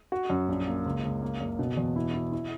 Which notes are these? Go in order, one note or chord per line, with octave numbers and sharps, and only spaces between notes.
F#4
F#2
A#1
A#3
C#2
C#2
A#3
F#1
B2
E2
E4
E4
E4